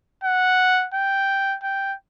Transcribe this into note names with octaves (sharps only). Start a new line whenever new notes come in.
F#5
G5
G5